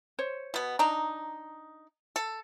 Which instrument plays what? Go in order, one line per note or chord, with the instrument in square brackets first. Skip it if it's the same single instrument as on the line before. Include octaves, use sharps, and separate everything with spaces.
[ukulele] C5 C#5
[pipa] B2 B3
[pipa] D4 D#4 [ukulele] A#5
[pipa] A4